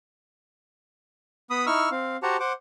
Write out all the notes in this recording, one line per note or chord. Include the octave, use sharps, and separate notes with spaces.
B3 B5 D#6
D#4 E4 C#6 E6 F6
C4 F5
F#4 G4 C5 F#5 A5 A#5
C5 F#5 D6